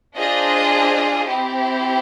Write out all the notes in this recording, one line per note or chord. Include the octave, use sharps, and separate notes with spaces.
D4 F4 G#4 C5 D#5
C4 E4 G4